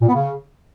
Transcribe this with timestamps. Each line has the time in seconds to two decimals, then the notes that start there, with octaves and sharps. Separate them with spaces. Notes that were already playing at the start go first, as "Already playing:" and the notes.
0.02 A#2
0.08 B3
0.14 C#3